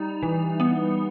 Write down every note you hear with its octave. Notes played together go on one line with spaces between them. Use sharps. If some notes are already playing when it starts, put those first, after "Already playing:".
Already playing: G3 D#4
E3
B3